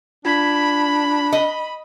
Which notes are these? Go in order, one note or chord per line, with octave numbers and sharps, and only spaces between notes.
D4 F4 B5 G#6 B6
D#5